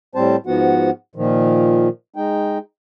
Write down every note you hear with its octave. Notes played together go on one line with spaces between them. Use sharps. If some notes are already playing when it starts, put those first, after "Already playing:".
A2 G3 C4 C5 A5
G#2 F3 B3 F#4 F#5
A#2 D#3 F3
G#3 D#4 G5